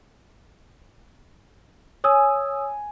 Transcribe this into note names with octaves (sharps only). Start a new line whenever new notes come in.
C#5 G#5 D#6 E6